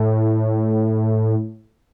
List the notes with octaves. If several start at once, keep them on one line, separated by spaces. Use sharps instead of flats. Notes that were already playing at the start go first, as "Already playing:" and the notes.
Already playing: A2